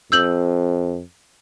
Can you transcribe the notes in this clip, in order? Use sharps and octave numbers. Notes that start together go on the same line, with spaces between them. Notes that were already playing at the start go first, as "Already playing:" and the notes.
F2 E6 G6 F#7